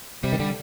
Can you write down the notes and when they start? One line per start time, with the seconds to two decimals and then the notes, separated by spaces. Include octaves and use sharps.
0.23 C3 G3
0.32 D#3
0.39 D3 G3